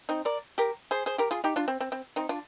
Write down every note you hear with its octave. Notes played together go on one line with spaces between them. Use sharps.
C4 D#4
A#4 D5
G4 A#4
G#4 C5
G#4 C5
G4 A#4
F4 G#4
D#4 G4
D4 F4
C4
C4
C4
C4 D#4
D4 F4